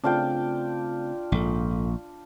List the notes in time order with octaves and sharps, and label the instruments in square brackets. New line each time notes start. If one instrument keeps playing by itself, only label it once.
[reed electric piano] C#3 A3 C4 [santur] D4 F4 G5
[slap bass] A#1 [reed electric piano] G#2 A4